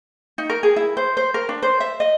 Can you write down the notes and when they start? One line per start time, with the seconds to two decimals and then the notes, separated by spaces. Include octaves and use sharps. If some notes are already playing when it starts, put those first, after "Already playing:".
0.38 D#4
0.50 A#4
0.63 G#4
0.76 E4
0.97 C5
1.17 C5
1.34 A#4
1.49 D4
1.62 C5
1.80 E5
2.00 D#5